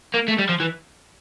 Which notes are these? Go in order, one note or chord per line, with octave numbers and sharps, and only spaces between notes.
A#3
A3
G3
F3
E3